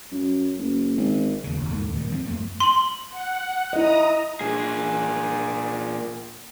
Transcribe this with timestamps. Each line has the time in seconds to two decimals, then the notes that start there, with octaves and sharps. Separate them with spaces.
0.12 F#2
0.58 F#1
0.97 G#1
1.44 D#2 C#3
1.57 F1
1.70 D#2 G#2 D3 D#3
1.94 A#2 D#3 G3
2.12 F3 C4
2.27 F#2 A2 A3 A#3
2.60 C6 F#7
3.10 F#5
3.73 E4 D#5 A#5 D#6
4.41 A#2 G#4